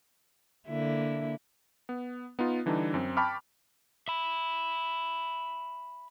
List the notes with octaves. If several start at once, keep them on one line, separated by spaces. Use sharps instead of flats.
D3 A#3 E4
B3
B3 D#4 F4
D3 E3 G3 D4 D#4
F#2 C4
G5 A5 B5 C#6 D6 F6
E5 B5